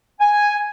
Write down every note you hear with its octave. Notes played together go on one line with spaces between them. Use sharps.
G#5